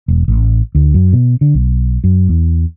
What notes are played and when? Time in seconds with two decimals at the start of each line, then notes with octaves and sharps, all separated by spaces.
0.08 E1
0.28 A1
0.75 D2
0.94 F#2
1.13 B2
1.41 D3
1.54 B1
2.04 F#2
2.29 E2